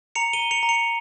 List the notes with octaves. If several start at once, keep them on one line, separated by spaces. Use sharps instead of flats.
A#5 C#7 F7
D#7 G7
A#5
C#7 F7
A#5
C#7 F7